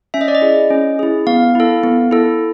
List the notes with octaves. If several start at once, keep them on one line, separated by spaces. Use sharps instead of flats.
C#4 E5
D#5
D5
D#5
E4 G#4
C#4
E4 G#4
B3 F5
E4 A4
B3
E4 A4